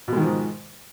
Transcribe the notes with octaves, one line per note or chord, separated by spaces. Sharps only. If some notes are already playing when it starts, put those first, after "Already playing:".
G#2 B2 D#3 F3 G#3